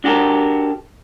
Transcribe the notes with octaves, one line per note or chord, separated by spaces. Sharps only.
D4 F#4 G4 A4 A#4